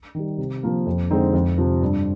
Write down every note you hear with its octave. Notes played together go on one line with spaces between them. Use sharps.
D#3 G3
C3
F3 A#3
F2
D3 G#3 C4 D#4
F2
C3 F3
G2